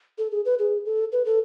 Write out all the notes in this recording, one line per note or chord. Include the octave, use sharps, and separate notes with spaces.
A4
G#4
B4
G#4
A4
B4
A4